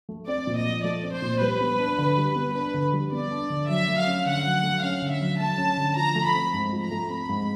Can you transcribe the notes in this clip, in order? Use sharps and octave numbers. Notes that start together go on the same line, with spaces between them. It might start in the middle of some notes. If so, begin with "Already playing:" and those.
A3
C4 D5
A#2
D#5
F3
A3 D5
C4
C5
A#2
G3 B4
B3
D4
D3
G3
B3
D4 B4
D3
G3
B3 D5
D4
D3
F#3 E5
A3
F5
C#4
D3 F#5
F#3
A3
C#4 F5
D3
E5
F#3
A3 A5
C#4
D3
F3 A#5
A3
B5
C4
G#2
F3
A#5
A3
C4 B5
G#2